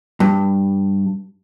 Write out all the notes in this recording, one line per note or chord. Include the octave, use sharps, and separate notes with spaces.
G2